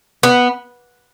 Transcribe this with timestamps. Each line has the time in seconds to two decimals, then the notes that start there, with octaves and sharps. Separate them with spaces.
0.23 B3